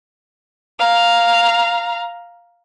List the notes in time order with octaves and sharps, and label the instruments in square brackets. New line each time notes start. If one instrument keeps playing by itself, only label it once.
[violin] F5 A#5